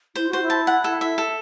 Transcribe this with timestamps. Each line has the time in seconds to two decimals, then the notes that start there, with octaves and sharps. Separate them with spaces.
0.15 E4 C5
0.29 F#4 C5
0.42 E4
0.50 A5
0.67 F#5
0.84 A4
1.01 E5
1.18 A4